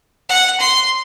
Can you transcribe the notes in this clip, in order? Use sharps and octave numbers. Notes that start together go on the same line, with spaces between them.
F#5
C6